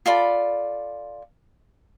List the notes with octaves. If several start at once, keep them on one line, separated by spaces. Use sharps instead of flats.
F4 A4 D5 B5